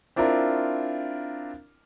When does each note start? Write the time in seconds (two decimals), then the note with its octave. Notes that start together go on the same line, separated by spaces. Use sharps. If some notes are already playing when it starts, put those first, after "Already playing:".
0.16 C4 D4 E4 F4 A#4